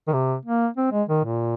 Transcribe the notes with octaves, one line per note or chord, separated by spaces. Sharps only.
D#3
C3
A#3
C4
G#3
D#3
A#2